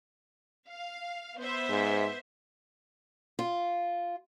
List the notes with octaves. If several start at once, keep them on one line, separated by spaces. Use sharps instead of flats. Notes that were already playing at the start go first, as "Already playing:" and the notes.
F5
B3 C5 E5
G#2
F4